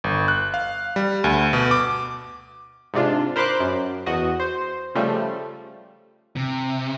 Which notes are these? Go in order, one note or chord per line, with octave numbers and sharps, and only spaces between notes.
G1
F#6
F5
G3
D2
B2
D6
G#2 C3 D4 F4
A#4 C5 B5 C6 D6 F#6
F#2
E2 F#4 D#5
C5
C#3 F3 G3 A3
C3